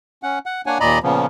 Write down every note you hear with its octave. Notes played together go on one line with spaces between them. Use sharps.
C#4 F#5
F#5
A#3 D4 C#5 F#5 G#5
D#2 A#2 D5 D#5 A#5 B5
A#2 C#3 F3 B3